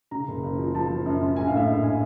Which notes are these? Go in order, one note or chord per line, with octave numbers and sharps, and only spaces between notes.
C#3 A#5
F#1
F#1
F3
F3 A5
F3
F#2
F#2
A#1 G#5
F5
A2 E5
A#1 D#5
G#5